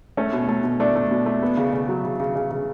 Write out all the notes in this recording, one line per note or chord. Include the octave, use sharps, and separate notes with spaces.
A3 C#4
B2
A3
B2
A3 D4
A3
B2
A3
B3
C#3
C#3
F#3
C#3
C#3
C#3
C#3